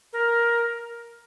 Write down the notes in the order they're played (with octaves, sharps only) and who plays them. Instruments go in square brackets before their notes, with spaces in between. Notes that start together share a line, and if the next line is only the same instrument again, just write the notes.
[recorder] A#4